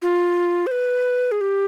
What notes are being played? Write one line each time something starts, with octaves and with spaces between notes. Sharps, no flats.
F4
C5
B4
G#4
G4